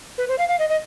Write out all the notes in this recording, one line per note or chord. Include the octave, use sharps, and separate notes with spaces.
B4
C5
F5
F5
D#5
D#5